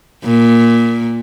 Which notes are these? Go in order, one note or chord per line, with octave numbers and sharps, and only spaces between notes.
A#2